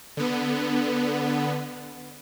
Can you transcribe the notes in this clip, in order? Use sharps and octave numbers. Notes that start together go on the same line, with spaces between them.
D3 B3